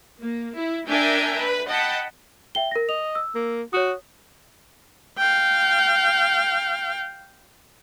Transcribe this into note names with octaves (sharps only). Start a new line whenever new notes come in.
A#3
E4
D4 A#4 E5 G5 G#5 A#5
B4
D#5 F#5 G5 A5 B5
E5 G5 G7
A#4 A#6
D#5 F7
E6
A#3
F#4 C#5 D#6
F5 G5